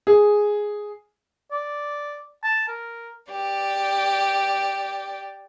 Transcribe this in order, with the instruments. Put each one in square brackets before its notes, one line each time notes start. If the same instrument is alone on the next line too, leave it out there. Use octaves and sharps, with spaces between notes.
[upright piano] G#4
[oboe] D5
A5
A#4
[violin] G4 D5